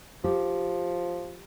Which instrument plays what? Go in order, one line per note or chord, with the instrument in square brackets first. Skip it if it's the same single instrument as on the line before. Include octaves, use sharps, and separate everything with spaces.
[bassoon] F3 [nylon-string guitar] G4